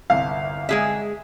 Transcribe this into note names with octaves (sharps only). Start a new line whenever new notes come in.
G1 C2 F5
G#3 G#4 E5